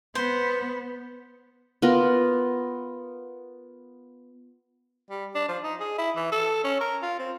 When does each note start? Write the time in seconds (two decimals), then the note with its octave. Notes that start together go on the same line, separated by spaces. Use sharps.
0.15 B3 C5
1.82 B3 F4 A#4
5.11 G3
5.35 D4
5.49 F3
5.63 D#4
5.80 G#4
5.98 E4
6.16 E3
6.32 A4
6.64 C#4
6.80 A#4
7.03 F4
7.19 C4